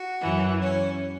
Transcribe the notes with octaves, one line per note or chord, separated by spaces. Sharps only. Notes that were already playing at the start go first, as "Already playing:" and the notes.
Already playing: F#4
F#2 E3
C#4